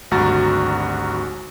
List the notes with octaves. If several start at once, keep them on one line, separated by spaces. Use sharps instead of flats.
G#1 D2 G3 F#4 A#5 A6